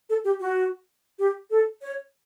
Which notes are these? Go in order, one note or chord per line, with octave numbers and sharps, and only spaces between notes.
A4
G4
F#4
G4
A4
C#5